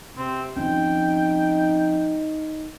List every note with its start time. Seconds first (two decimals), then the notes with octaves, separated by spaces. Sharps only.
0.17 C3 C4
0.57 F3 C4 C#4 D#4 G5